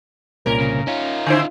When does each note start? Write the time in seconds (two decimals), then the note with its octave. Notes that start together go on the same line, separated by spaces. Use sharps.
0.46 C2 A#2 C#4 A#4
0.60 C#3
0.87 C#4 D#4 F4
1.27 D3 E4 C5